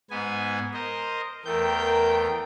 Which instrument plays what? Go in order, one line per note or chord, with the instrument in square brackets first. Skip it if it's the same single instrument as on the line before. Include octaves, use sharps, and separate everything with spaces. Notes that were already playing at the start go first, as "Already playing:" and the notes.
[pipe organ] G#2 B3 G#5
A#4 C5 D#5
[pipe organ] E2 A3 G6 [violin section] A#4 G5